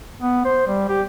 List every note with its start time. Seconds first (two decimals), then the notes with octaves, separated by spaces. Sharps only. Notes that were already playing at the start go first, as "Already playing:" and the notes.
0.22 B3
0.45 C5
0.67 G3
0.89 G4